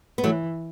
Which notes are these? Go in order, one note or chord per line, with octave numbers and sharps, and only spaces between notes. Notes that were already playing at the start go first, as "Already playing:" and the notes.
B3
E3 F#3 A3